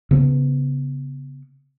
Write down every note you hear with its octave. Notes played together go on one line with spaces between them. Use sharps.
C#3 B3